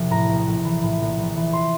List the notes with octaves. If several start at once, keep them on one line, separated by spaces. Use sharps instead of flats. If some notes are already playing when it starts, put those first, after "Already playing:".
Already playing: E1 C3 F3
A2 A#5
A#1
A#1
E3
A2
A#1
A#1
E3
C6